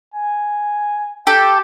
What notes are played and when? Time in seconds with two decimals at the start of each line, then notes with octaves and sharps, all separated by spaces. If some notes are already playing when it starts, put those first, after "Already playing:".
0.14 G#5
1.27 G4 A4 G5